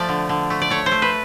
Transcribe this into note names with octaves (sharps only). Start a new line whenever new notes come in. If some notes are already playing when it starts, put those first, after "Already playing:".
Already playing: F3 A3 D5
D3
D3
A3
D5
A3 C#5
C5
A3
B4